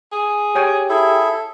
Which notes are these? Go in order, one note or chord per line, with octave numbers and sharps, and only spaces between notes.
G#4
G4 C#5 G5 G#5
E4 G#4 A4 E5